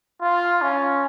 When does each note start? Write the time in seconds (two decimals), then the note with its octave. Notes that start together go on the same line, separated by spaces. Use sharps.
0.21 F4
0.62 C#4